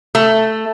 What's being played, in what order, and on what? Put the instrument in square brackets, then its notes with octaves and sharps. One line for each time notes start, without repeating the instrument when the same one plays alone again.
[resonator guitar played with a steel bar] A3